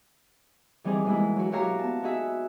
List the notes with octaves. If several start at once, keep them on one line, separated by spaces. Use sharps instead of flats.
E3 G3 C4 D#4 G#4
B2 E3 G#3 A#3 D#4 E4
F#3 F#4
E4 F#4 G4 C#5 F5 A#5
B3 A5
B3 D#4 F#4 G#4 E5